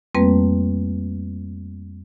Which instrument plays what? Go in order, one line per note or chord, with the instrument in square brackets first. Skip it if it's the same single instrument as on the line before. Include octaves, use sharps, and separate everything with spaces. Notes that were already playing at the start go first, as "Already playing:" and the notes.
[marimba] F2 G3 A3 A#3 C4 B4